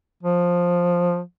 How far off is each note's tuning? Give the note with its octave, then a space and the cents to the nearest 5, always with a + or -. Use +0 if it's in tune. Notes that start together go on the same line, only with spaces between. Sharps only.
F3 +10